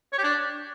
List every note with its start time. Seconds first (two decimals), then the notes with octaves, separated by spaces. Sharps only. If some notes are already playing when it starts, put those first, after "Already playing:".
0.12 C#5
0.18 G4
0.24 D4